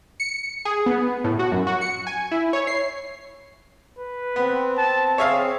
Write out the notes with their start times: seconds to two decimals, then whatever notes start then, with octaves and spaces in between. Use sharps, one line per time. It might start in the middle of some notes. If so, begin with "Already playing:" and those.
0.20 C#7
0.65 G#4
0.86 B3
1.24 A2
1.39 F#4
1.52 F#2
1.67 F#4
1.81 C#7
2.07 G#5
2.31 E4
2.53 C#5
2.67 C7
3.98 B4
4.36 B3 C4
4.78 A5
5.18 G#4 C#5 E5 F5